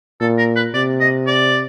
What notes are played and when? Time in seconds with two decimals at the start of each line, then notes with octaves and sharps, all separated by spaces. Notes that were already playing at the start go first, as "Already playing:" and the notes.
0.20 A#2 A4
0.38 A#4
0.56 B4
0.74 C3 D5
1.00 D#5
1.27 D5